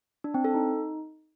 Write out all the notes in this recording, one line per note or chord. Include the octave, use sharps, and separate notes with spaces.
D4
C4
A4
D#4